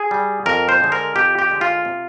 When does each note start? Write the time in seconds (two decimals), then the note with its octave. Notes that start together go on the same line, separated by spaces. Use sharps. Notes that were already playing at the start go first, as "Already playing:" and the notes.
Already playing: G#4
0.11 G3
0.46 F2 A#4
0.69 C5
0.80 D3 G#3
0.92 A#4
1.16 F2 G4
1.39 G4
1.50 D3 G#3
1.61 F4
1.85 C3